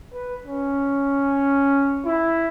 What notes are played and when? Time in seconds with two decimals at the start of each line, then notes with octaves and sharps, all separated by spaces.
0.13 B4
0.46 C#4
2.06 E4